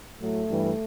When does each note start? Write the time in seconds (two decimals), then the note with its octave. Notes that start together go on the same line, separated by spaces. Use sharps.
0.19 A2 F#3 A3
0.48 G2 E3 G3